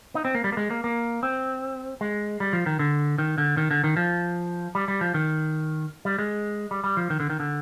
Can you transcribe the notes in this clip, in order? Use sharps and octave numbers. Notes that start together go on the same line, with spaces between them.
D#4
C4
A#3
G3
A#3
G#3
A#3
A#3
C4
G#3
G3
F3
D#3
D3
D#3
D3
D#3
D3
D#3
F3
G3
G3
F3
D#3
G3
G#3
G3
G3
F3
D#3
D3
D#3
D3